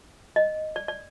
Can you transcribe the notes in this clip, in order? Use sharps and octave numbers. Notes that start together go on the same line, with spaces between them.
D#5
D5
D5